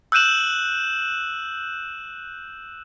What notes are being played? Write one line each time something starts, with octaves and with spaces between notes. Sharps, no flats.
E6 F#6 G6 D#7 E7 F#7